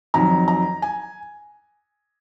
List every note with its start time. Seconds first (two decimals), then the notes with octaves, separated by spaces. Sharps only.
0.14 F2 D#3 F#3 A#5
0.48 A#5
0.82 G#5